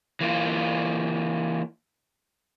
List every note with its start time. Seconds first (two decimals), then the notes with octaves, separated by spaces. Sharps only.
0.21 E3 A#3 F4